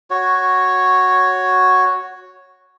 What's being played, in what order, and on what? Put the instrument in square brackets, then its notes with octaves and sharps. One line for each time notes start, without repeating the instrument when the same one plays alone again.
[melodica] F#4 C#5